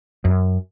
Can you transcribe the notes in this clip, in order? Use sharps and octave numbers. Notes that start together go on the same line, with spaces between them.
F#2